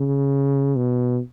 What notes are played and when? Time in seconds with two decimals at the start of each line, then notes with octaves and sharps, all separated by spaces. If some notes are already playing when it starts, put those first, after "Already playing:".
Already playing: C#3
0.76 B2